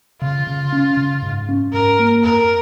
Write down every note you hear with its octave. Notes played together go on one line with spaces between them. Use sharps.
C#3 F4
C#3
C#4
C#3
G#2
C#4
G#2 A#4
A#3
F2 A#4